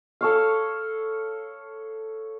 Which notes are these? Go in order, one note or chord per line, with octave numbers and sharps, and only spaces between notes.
A4 C#5 F5